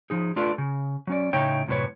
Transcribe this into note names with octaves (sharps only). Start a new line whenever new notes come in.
F3 D#4 G#4
A3 D4 F4 A4 B4
C#3
F#3 C#4 D5
A2 C#3 A3 D#4 C#5 G5
F#2 A2 C3 B3 B4 C#5